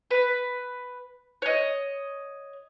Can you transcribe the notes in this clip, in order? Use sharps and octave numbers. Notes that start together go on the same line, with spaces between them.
B4
C#5 D#5